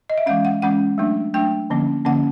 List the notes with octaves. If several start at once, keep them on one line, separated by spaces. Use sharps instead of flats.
D#5
E5
E3 G#3 C#4 F5
F#5
E3 G#3 C#4 F#5
F#3 A3 D4
F#3 A3 D4 G5
D3 F3 A#3 C#4
D3 F3 A#3 C#4 F#5